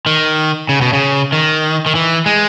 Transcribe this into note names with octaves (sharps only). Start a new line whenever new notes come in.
D#3
C#3
B2
C#3
D#3
D#3
E3
G#3